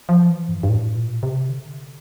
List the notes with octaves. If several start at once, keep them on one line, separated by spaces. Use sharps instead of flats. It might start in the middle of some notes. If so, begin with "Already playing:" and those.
F3
E3
G2
G2
A2
A#2
C3
D3